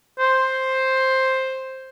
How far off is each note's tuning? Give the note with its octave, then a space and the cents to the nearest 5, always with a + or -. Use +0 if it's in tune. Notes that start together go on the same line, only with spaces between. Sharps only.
C5 +5